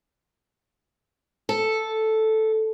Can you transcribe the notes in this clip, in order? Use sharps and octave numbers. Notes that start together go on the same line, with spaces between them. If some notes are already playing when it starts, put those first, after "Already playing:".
A4